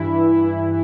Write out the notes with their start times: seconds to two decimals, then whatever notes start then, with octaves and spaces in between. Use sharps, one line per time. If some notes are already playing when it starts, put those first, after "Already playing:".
Already playing: G2 E3 E4